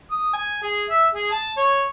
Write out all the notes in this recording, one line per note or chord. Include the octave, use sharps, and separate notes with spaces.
D#6
G#5
G#4
E5
G#4
A5
C#5